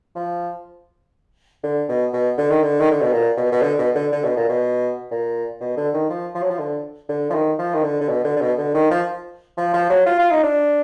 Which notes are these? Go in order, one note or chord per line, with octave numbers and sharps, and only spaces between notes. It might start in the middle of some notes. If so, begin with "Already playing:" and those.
F3
D3
B2
B2
D3
D#3
D3
D#3
D3
B2
A#2
B2
B2
D3
B2
D3
D3
B2
A#2
B2
A#2
B2
D3
D#3
F3
F3
F#3
F3
D3
D3
F3
D#3
F3
D#3
D3
D3
B2
D3
D3
B2
D3
D#3
F3
F3
F3
F#3
F4
F4
D#4
D4